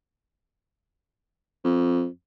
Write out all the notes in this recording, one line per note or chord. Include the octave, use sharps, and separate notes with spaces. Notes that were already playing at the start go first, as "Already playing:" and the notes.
F2